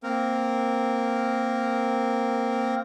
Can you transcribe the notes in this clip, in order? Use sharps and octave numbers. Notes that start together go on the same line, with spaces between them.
A#3 C4 A#4